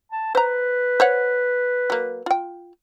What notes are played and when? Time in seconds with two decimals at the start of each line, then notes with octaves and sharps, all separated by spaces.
0.12 A5
0.35 B4 C5 A#5
1.00 C5 C#5 F#5
1.90 F#3 A#3
2.26 F4 G5